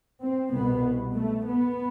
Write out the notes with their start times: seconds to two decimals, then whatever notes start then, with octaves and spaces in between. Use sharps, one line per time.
0.21 C4
0.52 C2 B2 B3
1.14 A3
1.45 B3